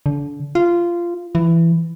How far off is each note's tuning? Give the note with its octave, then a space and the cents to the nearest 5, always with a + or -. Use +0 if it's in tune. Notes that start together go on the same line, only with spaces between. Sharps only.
D3 -30
F4 -15
E3 +15